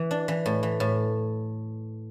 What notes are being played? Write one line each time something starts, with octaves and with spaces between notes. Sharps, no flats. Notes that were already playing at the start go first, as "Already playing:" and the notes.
Already playing: E3
D4
E3
A2
E3
A2